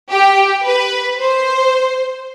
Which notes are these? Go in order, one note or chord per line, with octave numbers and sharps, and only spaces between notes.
G4
B4
C5